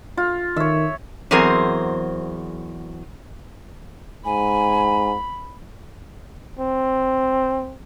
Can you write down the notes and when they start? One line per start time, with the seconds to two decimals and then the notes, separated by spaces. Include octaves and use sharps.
0.17 F4
0.56 D#3 C#5 E5
1.31 E2 F#3 C4 G#4 A#4 C5
4.25 G#2 G#5 B5
6.59 C4